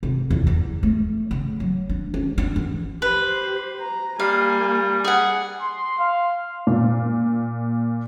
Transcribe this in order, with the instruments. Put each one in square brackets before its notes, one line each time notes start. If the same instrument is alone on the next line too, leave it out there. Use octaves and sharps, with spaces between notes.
[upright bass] C3
E2
E2
A3
C#3
F#3
D4
C#4
D4
E3
[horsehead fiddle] G4 C5 [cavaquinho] B4
[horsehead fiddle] A#5
[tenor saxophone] G3 [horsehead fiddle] A#3 G#5 [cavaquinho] F5
[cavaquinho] G#4 F#5
[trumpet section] C6
F5
[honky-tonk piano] A#2